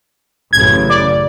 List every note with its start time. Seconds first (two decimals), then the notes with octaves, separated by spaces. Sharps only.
0.53 A1 F#2 C#3 G#6
0.90 D5